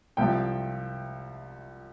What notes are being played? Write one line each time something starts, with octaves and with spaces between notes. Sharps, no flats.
C2 C3 F3 G5